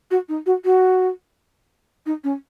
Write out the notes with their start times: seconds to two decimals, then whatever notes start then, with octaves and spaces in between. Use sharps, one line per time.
0.11 F#4
0.29 D#4
0.46 F#4
0.65 F#4
2.06 D#4
2.24 C#4